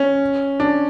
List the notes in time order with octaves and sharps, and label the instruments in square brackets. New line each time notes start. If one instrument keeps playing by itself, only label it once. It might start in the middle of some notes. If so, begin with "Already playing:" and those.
Already playing: [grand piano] C#4
D4